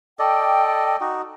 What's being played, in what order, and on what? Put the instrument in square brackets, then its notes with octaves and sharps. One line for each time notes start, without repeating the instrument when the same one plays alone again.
[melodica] A4 D5 D#5 [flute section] G5
[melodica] D#4 F#4